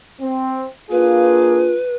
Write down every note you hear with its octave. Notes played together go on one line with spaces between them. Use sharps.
C4
A#3 D4 F4 G#4 B4